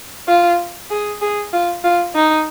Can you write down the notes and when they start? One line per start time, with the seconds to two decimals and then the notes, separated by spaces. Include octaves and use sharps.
0.28 F4
0.91 G#4
1.21 G#4
1.53 F4
1.84 F4
2.15 D#4